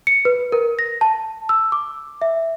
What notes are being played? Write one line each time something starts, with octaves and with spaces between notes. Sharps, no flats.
C#7
B4
A#4
A#6
A5
E6
D6
E5